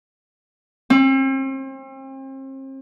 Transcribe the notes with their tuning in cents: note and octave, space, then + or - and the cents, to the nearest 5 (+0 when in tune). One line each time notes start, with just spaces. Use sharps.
C4 +40